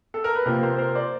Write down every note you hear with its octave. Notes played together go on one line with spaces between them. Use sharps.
A4
A#4
B4
C3 F3 A#3 A#4 C5
A#4 C5
A#4 C5
C5 D5